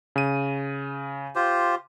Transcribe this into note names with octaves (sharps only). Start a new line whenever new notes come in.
C#3 D#7
F4 G4 C5